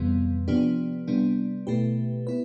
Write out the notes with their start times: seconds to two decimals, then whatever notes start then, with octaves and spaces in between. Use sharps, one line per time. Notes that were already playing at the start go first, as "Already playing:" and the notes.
Already playing: F2 C3 E3 G3 B3
0.48 C3 F3 B3 D4 G4
1.08 C3 G3 B3 D4
1.67 B2 A3 E4 G4 B4
2.27 B3 E4 B4